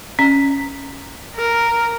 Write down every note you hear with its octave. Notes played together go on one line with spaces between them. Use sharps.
C#4
A#4